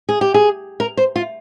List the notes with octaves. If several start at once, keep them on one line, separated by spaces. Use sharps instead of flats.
G#4
G4
G#4
A#4
C5
F4